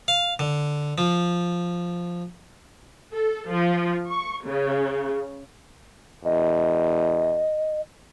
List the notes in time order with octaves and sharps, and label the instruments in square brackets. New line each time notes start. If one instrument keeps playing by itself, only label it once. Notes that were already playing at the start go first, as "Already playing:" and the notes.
[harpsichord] F5
D3
F3
[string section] A4
F3
C#6
C#3
[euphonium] E2 [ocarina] D#5